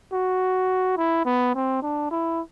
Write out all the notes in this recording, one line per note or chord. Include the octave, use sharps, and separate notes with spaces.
F#4
E4
B3
C4
D4
E4